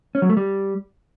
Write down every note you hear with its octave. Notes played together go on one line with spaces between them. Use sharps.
C#4
F#3
A3
G3